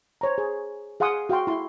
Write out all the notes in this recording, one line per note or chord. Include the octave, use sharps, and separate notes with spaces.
C5 C#5 A#5
G#4
G#4 F5 F#5 C6 D#6
F#4 F5 G5 C6
E4 C6